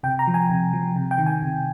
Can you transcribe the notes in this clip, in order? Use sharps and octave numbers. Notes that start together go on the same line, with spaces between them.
C3 G5
A#5
F3
G#5
C3
F3
C3
G5
D#3
G#5
C3